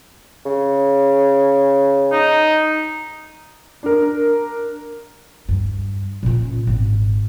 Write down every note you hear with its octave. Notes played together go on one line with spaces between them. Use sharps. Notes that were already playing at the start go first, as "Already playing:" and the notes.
C#3
D#4
D4 A#4
G2
A#2 C#4
G#1